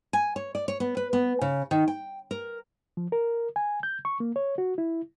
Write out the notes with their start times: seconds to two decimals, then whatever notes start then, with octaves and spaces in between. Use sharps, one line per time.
0.13 G#5
0.36 C#5
0.55 D5
0.68 C#5
0.80 B3
0.97 B4
1.13 B3
1.41 C#3
1.71 D#3
1.88 G5
2.31 A#4
2.97 F3
3.12 A#4
3.56 G#5
3.83 G6
4.05 C#6
4.20 A#3
4.36 C#5
4.58 F#4
4.78 E4